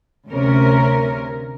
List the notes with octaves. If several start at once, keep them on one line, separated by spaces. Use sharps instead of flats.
D2 C3 C#4 A#4